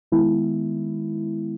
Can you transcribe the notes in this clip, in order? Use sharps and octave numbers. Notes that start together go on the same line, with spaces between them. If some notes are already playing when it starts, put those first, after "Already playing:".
D#3 G#3 B3 E4